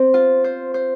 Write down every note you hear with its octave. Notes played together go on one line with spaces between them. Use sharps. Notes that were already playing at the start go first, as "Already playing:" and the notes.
Already playing: C4 C5
F4
C5
C5